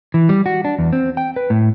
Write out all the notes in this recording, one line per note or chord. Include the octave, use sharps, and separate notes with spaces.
E3
G3
F#4
D4
E2
C4
G5
B4
A2